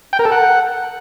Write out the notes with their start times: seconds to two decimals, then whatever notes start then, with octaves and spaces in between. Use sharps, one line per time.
0.13 G5
0.19 A#4
0.25 A4
0.32 F#5